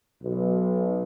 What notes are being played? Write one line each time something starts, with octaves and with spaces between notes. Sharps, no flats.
B1